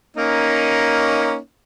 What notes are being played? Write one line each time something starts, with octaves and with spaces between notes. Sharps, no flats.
A#3 C#4 D#4